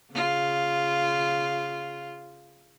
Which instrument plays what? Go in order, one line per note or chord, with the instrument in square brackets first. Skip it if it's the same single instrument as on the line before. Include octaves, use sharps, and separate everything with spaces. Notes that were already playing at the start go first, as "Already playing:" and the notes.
[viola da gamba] C#3 F4